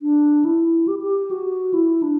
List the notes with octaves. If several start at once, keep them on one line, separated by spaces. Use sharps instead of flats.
D4
E4
G4
G4
F#4
E4
D4